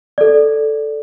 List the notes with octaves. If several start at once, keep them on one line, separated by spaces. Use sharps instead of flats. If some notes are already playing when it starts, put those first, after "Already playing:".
A4 D5